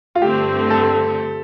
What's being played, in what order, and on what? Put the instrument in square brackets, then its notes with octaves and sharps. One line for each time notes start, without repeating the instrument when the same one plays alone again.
[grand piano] F4
[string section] G2 D3 A3 C4 [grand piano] G4
[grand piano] A4